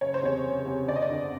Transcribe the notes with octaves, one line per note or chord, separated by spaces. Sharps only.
F#1 C#5
C5
E2 C3 C#5
F#1
E2 C3
G1 D5
D#5
D5
F2 D3